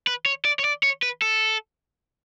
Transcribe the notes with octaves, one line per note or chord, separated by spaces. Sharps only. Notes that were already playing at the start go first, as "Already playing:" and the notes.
B4
C#5
D5
C#5
D5
C#5
B4
A4